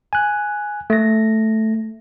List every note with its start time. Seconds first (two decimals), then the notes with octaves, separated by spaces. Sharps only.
0.13 G#5 F#6
0.90 A3 A#6